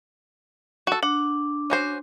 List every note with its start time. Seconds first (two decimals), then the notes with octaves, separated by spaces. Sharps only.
0.87 F#4 A4
1.03 D4 F#5
1.70 C#4 F#4 C5